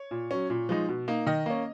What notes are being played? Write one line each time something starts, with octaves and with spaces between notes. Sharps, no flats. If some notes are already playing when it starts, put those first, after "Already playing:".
Already playing: C#5
A#2
F#3 C#4
A#2
F3 G#3 D#4
B2
A#3 D#4
D#3 D#5
A#3 C#4